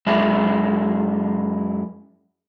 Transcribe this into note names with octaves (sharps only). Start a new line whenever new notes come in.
F#2 G#3 E4